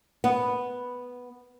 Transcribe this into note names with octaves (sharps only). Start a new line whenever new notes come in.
B3